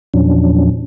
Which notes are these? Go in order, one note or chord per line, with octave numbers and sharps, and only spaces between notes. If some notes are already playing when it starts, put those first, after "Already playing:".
E2 A#2 F3 F#3 C#4 D4